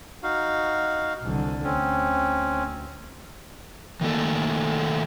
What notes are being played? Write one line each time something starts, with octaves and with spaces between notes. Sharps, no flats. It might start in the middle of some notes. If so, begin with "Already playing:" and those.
D#4 F#4 F5
C2 D3
D2 C4 C#4
D#3 A3 A#3 A4